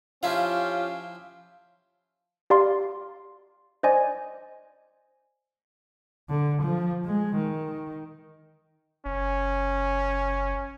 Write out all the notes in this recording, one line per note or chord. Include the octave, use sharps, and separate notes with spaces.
F3 C#4 E4 F4 G4 F5
G4 D5 F5 A#5 C6
C5 D5 D#5 G#5
D3
F3
G#3
D#3
F#1 C#4